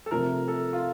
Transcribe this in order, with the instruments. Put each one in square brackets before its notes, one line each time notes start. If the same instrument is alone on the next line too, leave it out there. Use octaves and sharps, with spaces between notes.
[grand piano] A4
[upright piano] C3 F3 A3 [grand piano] A#4
[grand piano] A4
F4